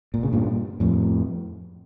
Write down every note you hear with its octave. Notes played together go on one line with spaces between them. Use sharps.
A#2
C#3
G2 A#2
F2 A2